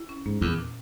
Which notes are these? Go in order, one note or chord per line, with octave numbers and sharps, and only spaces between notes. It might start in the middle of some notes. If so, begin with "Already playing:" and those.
Already playing: E4
C#4
G#2 A#3
E2 A#2
A#2